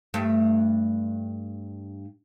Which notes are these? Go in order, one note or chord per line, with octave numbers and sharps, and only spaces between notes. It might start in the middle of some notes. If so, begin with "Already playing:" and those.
G2 A3